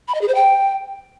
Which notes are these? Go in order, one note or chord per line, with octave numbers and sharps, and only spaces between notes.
B5
D#5
G#4
C5
G5